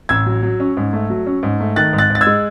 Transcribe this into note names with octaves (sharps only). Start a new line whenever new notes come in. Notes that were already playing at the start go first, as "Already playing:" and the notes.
A1 E6 G#6
F#3
F#3
C#4
G#2
A3
F#3
C#4
G#2
A3
D#3 F#6 A6
G#2
F#6 A6
G#2
A6
E6 G#6
G#3